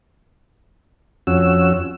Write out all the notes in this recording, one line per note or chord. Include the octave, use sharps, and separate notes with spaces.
F2 C#4 F#4 E6